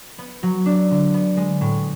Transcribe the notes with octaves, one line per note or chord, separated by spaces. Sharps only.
B3
F#3
D4
D3
B3
G#3
A2